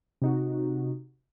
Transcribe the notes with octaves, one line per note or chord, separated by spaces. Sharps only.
C3 D#4 F#4